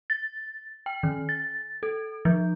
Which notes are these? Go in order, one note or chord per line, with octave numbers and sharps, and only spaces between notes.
A6
G5
D#3
A6
A4
F3